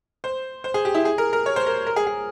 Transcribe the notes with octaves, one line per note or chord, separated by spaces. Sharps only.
C5
C5
G#4
G4
E4
G#4
A#4
A#4
C#5
C5
A#4
A#4
G#4
G#4